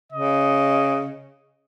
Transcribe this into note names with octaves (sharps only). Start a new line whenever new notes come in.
C#3 D#5